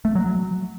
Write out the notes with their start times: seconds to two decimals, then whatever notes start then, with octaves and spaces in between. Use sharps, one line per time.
0.05 A3
0.15 F#3
0.26 F#3